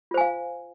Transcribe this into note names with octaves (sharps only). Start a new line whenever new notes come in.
F4 C5 F5 G#5